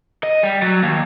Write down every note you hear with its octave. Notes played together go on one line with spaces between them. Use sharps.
D#5
G3
F#3
D#2